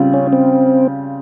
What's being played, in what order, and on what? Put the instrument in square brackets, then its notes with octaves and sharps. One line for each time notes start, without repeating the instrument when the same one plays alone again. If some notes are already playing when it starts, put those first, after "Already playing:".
Already playing: [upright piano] C#3 G3 C4 F4
[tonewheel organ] C#4
C4